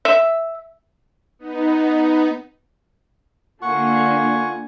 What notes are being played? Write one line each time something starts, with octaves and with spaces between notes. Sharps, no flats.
E5
B3 D#4
D3 A#3 F4 F#5 G#5 C#6